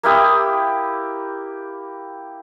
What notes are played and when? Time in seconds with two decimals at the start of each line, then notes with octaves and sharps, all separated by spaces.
0.03 A#3 E4 G4 D#6